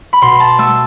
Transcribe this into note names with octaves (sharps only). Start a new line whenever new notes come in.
B5
B2 C6
A5
A3 E6